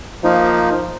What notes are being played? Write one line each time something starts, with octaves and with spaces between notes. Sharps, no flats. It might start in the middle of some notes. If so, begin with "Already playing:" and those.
F3 A#3 D#4